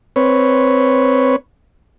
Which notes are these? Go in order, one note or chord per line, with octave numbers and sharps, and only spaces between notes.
C4 B4 C#5